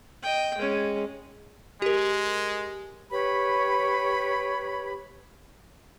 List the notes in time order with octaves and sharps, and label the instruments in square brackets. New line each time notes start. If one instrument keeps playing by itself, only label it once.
[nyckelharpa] D#5 G5
G#3 C#4
[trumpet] G#3 [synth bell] G4 A#4
[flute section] G4 B4 C#5 B5